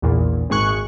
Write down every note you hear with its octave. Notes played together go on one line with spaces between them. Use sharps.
A#1 E2 A#2
G#1 G#3 G#4 C#6 F#6